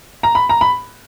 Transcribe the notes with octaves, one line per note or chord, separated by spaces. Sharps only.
A#5
B5
A#5
B5